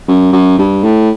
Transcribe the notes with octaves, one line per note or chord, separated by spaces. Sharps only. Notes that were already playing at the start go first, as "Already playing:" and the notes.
F#2
F#2
G2
A2